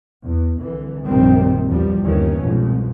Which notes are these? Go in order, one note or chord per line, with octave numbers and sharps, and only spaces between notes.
E2
C2 D3 E3
A#1 F#2 C3 D#3 G3 C4
E2 G2 F3 G3
G1 D#2 D#3 E3 C#4
C2 F2 G#2 B2